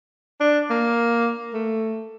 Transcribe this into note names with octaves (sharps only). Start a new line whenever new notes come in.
D4
A#3
A3